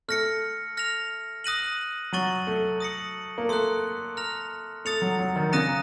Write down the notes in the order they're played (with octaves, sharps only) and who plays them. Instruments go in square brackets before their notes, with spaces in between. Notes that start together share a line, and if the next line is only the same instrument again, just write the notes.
[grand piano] A3 [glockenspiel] F6 A#6 C#7
[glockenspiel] F6 A#6 F7
D#6 F#6 A#6 D#7 F#7
[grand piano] F#3 [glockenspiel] C#6 A6 D#7 F#7
[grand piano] A3
[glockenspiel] D#6 A#6 C#7 F#7
[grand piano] A#3
[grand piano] A3 [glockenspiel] C6 D#6 F#6
[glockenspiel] A#5 F6 A#6 F7
[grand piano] A3 [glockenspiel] D#6 A6 C#7 F7
[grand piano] F#3
F#3
D#3
D#3
[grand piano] C#3 [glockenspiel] A#5 D#6 F#6 A#6 D#7